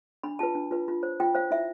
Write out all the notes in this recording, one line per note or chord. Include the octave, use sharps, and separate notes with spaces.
D4 B5
F4 B4 A5
D4
F4 B4
F4
C5
F4 G5
C5 F5
E4 E5